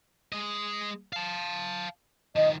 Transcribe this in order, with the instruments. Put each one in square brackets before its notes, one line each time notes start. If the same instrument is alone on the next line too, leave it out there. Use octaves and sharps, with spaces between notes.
[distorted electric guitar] G#3 D#5
F5 A5
[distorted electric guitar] D#3 F3 [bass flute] D#5